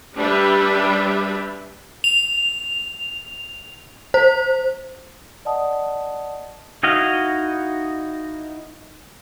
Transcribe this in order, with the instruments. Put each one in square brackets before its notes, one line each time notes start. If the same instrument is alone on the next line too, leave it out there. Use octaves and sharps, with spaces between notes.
[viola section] G3 D4 G4 B4 E5
[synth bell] F7
C5
[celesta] D5 D#5 F#5 A5 D#6
[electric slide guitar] D#4 E4 F#4 D#5 F5